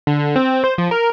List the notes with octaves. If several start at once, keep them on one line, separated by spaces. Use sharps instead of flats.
D3
C4
C5
F3
A#4